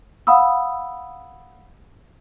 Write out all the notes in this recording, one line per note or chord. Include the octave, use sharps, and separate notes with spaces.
F5 F#5 B5 D#6 E6